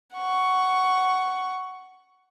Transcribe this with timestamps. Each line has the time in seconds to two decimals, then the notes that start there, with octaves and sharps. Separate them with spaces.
0.15 F#5 C#6